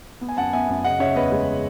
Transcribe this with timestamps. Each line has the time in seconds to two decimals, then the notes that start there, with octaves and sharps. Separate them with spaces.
0.21 B3
0.29 G#5
0.37 F#2 F#5 A5
0.53 B3 E5 G#5
0.69 F#2
0.84 C#3 D#5 F#5
1.00 C#3 C#5 E5
1.16 E2 B4 D#5
1.32 G#3